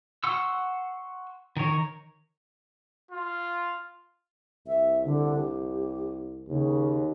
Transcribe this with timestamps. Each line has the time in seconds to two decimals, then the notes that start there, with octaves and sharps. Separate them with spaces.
0.24 F#5 C6 C#6 E6
1.57 D#3 A#4 C#5
3.11 F4
4.66 C2 E5
5.05 D3
5.36 G4
6.48 D#2 C#3